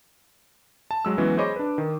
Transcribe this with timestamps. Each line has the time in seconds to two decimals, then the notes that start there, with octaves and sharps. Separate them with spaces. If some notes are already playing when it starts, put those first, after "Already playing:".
0.91 A5
1.05 F#3 G#3 E6
1.18 E3 F#3 G#3 B3 C#4
1.37 G#4 C5 C#5 D#5 B5 D6
1.56 D4 B4
1.78 D#3